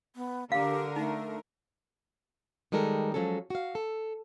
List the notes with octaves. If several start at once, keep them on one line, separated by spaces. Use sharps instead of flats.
B3
D3 G4 A#4 F5
A3 D#4
D#3 G3 G#3 A4 A#4
F3 F#3 G#3 C#4 A4
F#4 F5
A4